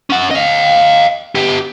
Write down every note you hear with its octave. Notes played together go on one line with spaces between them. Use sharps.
C#4 F#5
D#5 F5
B3 G4